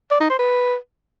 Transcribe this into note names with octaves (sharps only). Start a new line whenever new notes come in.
D5
D#4
C5
B4